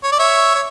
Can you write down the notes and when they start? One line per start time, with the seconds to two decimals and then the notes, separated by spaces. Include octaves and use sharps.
0.04 C#5
0.12 D5
0.19 C#5 E5
0.55 C#5